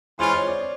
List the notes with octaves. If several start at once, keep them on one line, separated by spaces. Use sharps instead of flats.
E3 G#3 C#4 F4 C5
C#5
D5